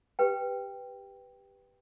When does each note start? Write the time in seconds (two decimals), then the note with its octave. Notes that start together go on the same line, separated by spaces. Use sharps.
0.19 G4 B4 G5